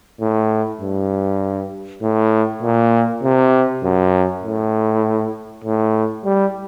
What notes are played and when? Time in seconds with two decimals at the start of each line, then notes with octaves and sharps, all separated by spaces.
0.21 A2
0.81 G2
2.02 A2
2.62 A#2
3.23 C3
3.83 F#2
4.43 A2
5.64 A2
6.25 G3